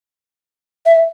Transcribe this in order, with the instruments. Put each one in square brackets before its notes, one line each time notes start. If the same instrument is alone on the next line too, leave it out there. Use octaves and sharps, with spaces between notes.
[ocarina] E5